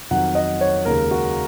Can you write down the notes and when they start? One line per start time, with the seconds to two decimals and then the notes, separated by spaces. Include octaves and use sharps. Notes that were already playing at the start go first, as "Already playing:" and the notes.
0.11 F2 D#3 F#3 F#5
0.35 D#5
0.61 C#5
0.85 D#2 C#3 G#3 A#4
1.11 F#4